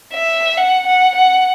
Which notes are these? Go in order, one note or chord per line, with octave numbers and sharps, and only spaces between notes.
E5
F#5
F#5
F#5